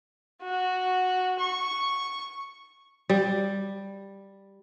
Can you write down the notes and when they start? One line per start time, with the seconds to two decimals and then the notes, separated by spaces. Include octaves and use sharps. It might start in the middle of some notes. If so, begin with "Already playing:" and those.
0.42 F#4
1.39 C#6
3.09 G3